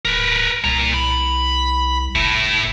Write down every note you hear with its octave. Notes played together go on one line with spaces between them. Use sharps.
D1 A#4 B4
C2 A#2 A#5
B5
F1 A2 E4